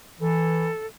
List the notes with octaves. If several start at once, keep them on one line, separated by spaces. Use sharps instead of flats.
E3 A4